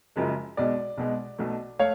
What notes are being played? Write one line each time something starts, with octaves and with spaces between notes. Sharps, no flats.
F#1 F#2 C#3 F3 G#3
B1 B2 G#3 D5
B1 B2 G#3
B1 B2 A3
A3 C#5 F5